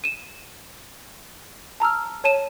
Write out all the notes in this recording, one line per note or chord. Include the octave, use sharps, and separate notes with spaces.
D#7 E7
A5 A#5 E6 F6
C#5 A5 D#7 E7